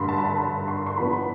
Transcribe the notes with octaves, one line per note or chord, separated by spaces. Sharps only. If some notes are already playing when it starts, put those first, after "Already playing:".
Already playing: G2 D3 A3 B5 C6
A5
B5
A5
B5
C6
C6
A2 F3 B3 D4 B5
B5